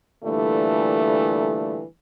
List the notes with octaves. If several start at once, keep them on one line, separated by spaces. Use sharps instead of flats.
A#2 D3 E3 G3 A3